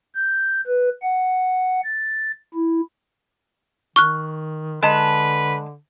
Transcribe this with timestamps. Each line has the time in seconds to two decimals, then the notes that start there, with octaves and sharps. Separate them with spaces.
0.15 G6
0.67 B4
1.02 F#5
1.84 A6
2.55 E4
3.96 D#3 C#6 F6 F#6
4.83 D3 G#3 B4 A5